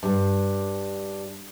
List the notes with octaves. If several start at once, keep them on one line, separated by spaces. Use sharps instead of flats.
G2